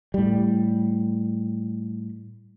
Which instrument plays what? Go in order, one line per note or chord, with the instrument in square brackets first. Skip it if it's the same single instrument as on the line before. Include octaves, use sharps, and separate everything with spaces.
[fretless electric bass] A2 G3